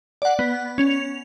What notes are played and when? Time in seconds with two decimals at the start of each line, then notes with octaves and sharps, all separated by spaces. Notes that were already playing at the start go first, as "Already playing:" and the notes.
0.22 D5 F#5
0.39 B3
0.78 C#4 F7